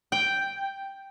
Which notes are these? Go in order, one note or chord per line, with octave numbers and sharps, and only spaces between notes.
G5